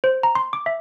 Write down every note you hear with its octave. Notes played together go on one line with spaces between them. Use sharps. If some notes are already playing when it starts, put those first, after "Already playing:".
C5
A#5
C6
D6
E5